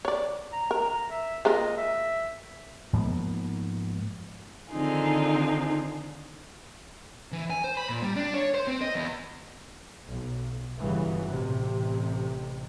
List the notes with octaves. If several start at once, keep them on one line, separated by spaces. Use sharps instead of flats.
C#5 D5
A#5
A#4
E5
G#3 A#3 F4 D#5
E5
G#2 F3 A#3 B3
D3 D#3 C4 D#4 F4 G#4
E3
G#5
C5
B5
A#2
G3
D4
C#5
C5
C4
D#5
E2
B1
G1 C#3 E3 F#3
A1 C3